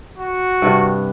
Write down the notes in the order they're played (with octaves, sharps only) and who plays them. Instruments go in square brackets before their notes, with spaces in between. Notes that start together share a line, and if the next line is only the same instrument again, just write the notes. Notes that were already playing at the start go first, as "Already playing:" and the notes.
[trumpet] F#4
[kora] G2 C3 F#5